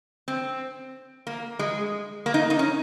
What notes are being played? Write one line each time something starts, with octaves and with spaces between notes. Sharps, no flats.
C4
A#3
G#3
A#3
D#4
D#4
C#4